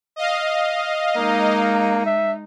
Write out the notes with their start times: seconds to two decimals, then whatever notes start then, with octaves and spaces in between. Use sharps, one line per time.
0.16 D#5 F5
1.16 G#3 A#3 D#4
2.06 E5